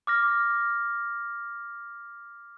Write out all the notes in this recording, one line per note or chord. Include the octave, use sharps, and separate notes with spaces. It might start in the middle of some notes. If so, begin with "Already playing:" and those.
D6 F6 A#6